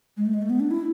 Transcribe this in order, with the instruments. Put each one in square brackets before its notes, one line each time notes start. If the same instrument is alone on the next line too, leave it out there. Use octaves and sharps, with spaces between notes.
[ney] G#3
A3
G#3
A3
B3
D4
E4